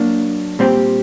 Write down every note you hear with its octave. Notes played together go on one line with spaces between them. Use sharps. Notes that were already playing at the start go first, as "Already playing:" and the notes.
Already playing: F#3 A#3 D4
A#2 G3 C4 G4